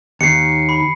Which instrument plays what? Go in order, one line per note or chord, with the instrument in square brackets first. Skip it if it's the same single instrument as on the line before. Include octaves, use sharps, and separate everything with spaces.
[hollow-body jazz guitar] D#2 [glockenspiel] C7 C#7
[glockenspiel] B5